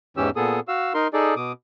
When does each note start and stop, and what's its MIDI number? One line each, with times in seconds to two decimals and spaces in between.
0.17 0.30 40
0.17 0.30 44
0.17 0.30 52
0.17 0.30 61
0.17 0.30 67
0.17 0.30 88
0.36 0.60 46
0.36 0.60 59
0.36 0.60 68
0.36 0.60 69
0.36 0.60 87
0.68 0.93 66
0.68 0.93 77
0.68 0.93 88
0.94 1.08 63
0.94 1.08 70
0.94 1.08 84
1.13 1.34 63
1.13 1.34 68
1.13 1.34 69
1.13 1.34 74
1.36 1.52 47
1.36 1.52 86
1.36 1.52 87